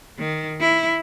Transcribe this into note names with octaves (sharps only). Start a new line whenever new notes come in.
D#3
E4